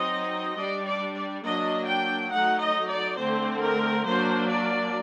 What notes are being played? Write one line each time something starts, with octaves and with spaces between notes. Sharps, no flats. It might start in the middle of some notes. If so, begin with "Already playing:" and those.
Already playing: F#3 C4 D#4 D#5
G3 D4 D5
D5
D5
F#3 A#3 D4 D#5
G5
F#3 A3 D#4 F#5
D#5
D5
D3 A3 C4 C5
A#4
F#3 A#3 D4 C5
D5